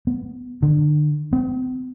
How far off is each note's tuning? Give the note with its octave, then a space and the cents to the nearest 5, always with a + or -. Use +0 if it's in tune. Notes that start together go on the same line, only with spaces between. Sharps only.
B3 +5
D3 +35
C4 -45